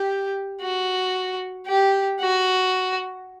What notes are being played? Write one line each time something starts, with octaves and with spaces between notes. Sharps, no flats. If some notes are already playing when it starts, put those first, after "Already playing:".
Already playing: G4
F#4
G4
F#4